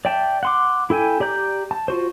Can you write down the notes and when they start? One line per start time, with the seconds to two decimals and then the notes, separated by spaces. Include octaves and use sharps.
0.05 D5 E5 G5 A5
0.43 F#5 C6 D6
0.90 E4 A4 G5 G#5
1.20 G4 D5 A#5 G6
1.71 A5
1.88 F4 F#4 C5